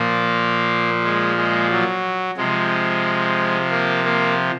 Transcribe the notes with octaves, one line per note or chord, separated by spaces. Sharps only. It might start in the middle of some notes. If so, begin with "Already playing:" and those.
Already playing: A#2 F3 A#3
G#3
G#3
F#3
C3 F3 G#3
A#3
A#3